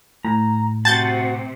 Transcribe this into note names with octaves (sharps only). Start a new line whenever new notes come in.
A2 A#5
C3 F#4 A5 G6 A6